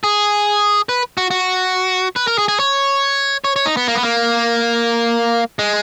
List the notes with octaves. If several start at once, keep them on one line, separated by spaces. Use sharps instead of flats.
G#4
B4
F#4
F#4
B4
A#4
G#4
G#4
C#5
C#5
C#5
D#4
B3
A#3
B3
A#3
G#3